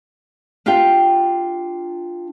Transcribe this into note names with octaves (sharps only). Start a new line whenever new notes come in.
D4 F4 G4 F5 G5